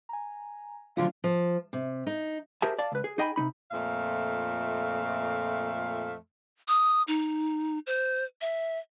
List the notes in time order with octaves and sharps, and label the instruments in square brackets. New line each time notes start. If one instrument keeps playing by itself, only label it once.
[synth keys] G#5 A#5
[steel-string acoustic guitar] D2 D3 F3 [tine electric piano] F#3 A3 D4 [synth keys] F4 [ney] F5
[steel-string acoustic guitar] F3
C3
D#4
[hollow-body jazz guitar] G4 G#4 A#4 C5 E5 A5
D5 F5 A5
C#2 B4
G#4
D#4 G#4 D#5 G5 G#5 B5
C3 D#3 D#4 B5
[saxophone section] F2 A#2 A3 E5 F5
[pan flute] D#6
D#4
C5
E5